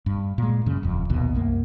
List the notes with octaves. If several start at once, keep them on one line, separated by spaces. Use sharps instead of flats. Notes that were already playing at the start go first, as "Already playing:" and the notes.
G2
A#2 G#3
F#2 C#3
D#1 F2
A#1 D#2 B2
C2 F#2 A#3